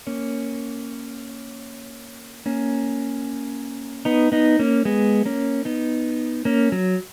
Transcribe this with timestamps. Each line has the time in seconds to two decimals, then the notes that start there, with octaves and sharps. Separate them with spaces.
0.07 A#3 C#4
2.46 A#3 C#4
4.05 B3 D#4
4.32 B3 D#4
4.59 A#3 C#4
4.85 G#3 B3
5.25 A#3 C#4
5.65 B3 D#4
6.45 A#3 C#4
6.72 F#3